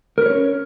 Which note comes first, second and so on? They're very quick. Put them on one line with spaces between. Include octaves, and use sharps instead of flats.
A#4 B4 C#5 C#4